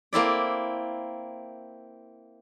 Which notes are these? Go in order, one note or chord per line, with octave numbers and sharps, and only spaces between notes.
A#3 C4 E4 D5